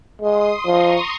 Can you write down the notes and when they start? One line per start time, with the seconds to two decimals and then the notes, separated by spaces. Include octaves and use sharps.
0.21 G#3 C6 D#6
0.66 F3 A#5 C#6